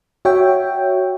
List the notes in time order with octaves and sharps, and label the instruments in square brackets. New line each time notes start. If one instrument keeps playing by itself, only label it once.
[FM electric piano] F#4 C#5 E5 G5